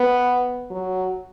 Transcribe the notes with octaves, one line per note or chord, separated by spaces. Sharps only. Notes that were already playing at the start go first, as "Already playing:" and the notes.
Already playing: B3
F#3